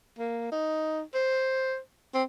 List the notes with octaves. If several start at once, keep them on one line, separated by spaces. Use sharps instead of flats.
A#3
D#4
C5
C4